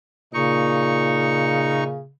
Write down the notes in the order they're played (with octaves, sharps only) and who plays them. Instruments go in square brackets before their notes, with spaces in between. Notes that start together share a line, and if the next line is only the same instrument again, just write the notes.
[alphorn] A#2 [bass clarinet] C#3 [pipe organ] D#4 C#6